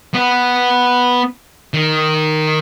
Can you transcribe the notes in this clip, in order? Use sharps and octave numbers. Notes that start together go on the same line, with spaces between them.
B3
D#3